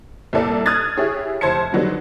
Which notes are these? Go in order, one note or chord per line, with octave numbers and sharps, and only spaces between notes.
C2 A#2 G3 E4 A4 D5
D#6 F6 F#6 G#6 A6
E4 G4 G#4 C#5
F1 E4 C5 A5 G#6 C#7
D3 D#3 F#3 G3 B3 D#4